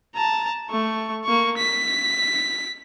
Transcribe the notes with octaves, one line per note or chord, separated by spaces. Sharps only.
A5 A#5
A3 C#6
A#3 C#6
B6